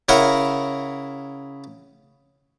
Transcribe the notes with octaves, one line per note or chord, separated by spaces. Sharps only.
C#3 E4 A#4 F#5